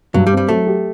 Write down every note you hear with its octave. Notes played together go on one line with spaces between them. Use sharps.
G2 F#3
G3
C4
G3
F#3 A3
G4